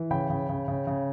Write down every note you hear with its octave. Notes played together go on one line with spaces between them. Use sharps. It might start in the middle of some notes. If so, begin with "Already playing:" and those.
Already playing: E3
C#3 G5 B5
C#3
C#3
C#3
C#3